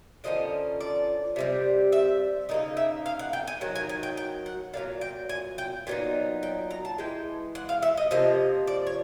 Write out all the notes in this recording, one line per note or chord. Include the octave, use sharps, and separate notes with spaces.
D3 F3 A#3 C#4 D#5
D5
C3 D#3 G3
E5
C#3 F3 A#3 D#4 D#5
E5
F5
F#5
G5
G#5
D#3 F#3
G#5
G#5
G5
G5
F#5
A#2 F#3 A#3 D4 F5
G5
G#5
G5
A#2 F#3 B3 D#4
G5
A#5
A5
E3 G#3 G5
F#5
F5
E5
D#5
C3 F3 A#3 D#5
D5
C#5